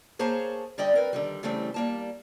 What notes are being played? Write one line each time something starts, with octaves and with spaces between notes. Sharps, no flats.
A#3 G#4 C5 C#5 A5 A#5
D3 G3 D5 D#5 G5
C4 A#4 B4
D3 D#3 G3
C#3 E3 G3 A3 C4
G3 A#3 A5